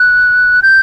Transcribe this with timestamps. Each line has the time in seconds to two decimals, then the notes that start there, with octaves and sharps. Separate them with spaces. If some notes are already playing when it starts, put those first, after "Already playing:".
Already playing: F#6
0.63 G6